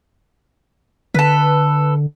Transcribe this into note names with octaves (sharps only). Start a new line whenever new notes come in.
D3 A4 B4